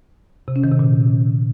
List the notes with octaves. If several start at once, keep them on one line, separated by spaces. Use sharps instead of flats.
C3
C#4
D#3
C3
A#2